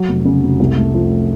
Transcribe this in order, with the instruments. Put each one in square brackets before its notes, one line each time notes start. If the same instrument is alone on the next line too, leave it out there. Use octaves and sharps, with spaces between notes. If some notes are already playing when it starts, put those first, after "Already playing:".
Already playing: [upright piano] F#3
F1
C#3
F1
C2
A3
F3